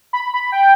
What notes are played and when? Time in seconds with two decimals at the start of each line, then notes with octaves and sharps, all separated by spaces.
0.13 B5
0.34 B5
0.52 G5